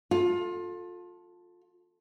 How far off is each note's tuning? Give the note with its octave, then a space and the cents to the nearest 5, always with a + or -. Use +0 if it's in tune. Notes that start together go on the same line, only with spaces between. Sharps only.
F4 +25 A4 +0